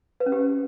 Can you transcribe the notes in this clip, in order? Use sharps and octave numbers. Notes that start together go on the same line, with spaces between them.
B4
C#4
G4